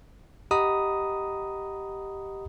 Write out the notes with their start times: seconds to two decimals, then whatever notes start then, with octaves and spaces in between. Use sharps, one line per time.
0.51 G4 D#5 F#5 A#5 B5 D#6